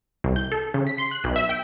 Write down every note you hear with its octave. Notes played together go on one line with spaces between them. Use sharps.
C2
G6
A4
C#3
B6
C6
F#6
B1
E5
G5